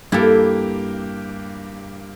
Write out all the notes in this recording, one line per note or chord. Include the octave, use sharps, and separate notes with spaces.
G2 A#3 E4 G4 A4